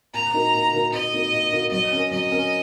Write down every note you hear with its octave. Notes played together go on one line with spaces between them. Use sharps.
A#2 A#5
A#3 D#4 F#4 A#4
A#2
A#3 D#4 F#4 A#4
A#2 D#5
A#3 D#4 F#4 A#4
A#2
A#3 D#4 F#4 A#4
F#3 D#5
C#4 A#4
F#3 D#5
C#4 A#4